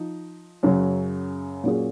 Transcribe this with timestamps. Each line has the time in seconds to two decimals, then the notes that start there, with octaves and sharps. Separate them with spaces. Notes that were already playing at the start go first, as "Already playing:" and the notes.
Already playing: F3 D#4
0.63 F#2 C#3 F#3
1.64 A#2 F#3 A#3 C#4 G#4